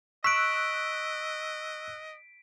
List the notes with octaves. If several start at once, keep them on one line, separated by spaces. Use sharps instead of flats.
D#5 C#6 E6 F#6 B6 D7